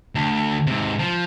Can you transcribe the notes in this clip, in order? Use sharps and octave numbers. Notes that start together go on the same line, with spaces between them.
D2
G#2 C3
F3